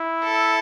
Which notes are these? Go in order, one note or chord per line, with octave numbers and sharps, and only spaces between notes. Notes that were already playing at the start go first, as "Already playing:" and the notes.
Already playing: E4
A4